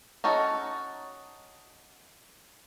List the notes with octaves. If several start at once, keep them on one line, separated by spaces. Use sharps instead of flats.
C#4 D#4 F#4 A4